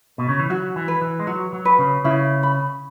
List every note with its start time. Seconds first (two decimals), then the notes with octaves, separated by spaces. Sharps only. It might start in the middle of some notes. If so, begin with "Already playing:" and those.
0.18 B2
0.29 C#3
0.39 E3
0.50 F#3 F#4
0.76 E3
0.88 B4
1.02 E3
1.20 G#3
1.27 F#3 F#4
1.53 F#3
1.65 B4
1.79 C#3
2.04 C#3 E4
2.43 B5